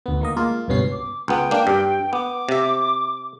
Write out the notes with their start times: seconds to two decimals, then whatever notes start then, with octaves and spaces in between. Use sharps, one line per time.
0.06 D2 B3
0.21 D#3 A#3 D#5
0.37 G#3 A#3 F4
0.68 C#2 G2 B2 B3 C#4 C7
0.92 D6
1.28 C#2 B3 G5
1.51 A#3 D4
1.67 G2
2.13 B3 D6
2.49 C3 E5